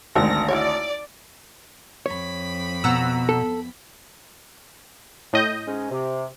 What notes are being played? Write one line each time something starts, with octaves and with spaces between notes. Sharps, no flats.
G#1 D2 C4 F#4 A#4 A#6
E4 F#4 C#5 D5
F2 C#5 B5
B2 F#5 A#5 E6
A4
A2 D#5 G6
G#2 G#3 C#4
C3